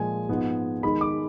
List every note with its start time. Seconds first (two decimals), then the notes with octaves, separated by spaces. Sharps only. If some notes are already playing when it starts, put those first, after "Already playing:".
Already playing: A#2 F3 G#3 G#5
0.29 G#2 F3 G#3 B3
0.83 D#3 G#3 D#4 B5
1.01 D6